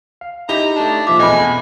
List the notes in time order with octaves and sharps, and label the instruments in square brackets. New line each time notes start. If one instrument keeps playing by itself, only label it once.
[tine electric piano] F5
[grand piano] D#4 G4 [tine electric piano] E4 [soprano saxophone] A#5
[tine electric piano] A3 A5 [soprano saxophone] D4
[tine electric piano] A#2 F3 F4 [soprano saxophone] E5 [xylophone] D6
[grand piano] E2 B2 [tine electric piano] A3 C4 [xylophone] D#5 B5 [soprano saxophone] G#5